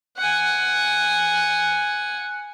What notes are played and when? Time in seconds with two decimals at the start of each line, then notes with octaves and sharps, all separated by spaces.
0.17 F#5 G#5